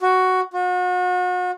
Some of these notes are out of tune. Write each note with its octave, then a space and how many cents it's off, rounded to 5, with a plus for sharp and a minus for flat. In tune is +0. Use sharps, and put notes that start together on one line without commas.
F#4 +5
F#4 -40